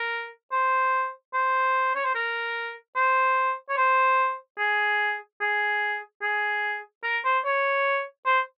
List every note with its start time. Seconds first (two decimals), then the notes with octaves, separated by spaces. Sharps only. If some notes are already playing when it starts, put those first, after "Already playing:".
Already playing: A#4
0.52 C5
1.34 C5
1.95 C#5
2.04 C5
2.15 A#4
2.96 C5
3.69 C#5
3.77 C5
4.59 G#4
5.41 G#4
6.22 G#4
7.03 A#4
7.25 C5
7.45 C#5
8.26 C5